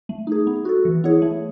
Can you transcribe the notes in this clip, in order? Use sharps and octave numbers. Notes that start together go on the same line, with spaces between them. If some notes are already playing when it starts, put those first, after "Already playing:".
A3
D#4 G#4
B3
F#4 A4
E3
B3 E4 G#4 C#5
A3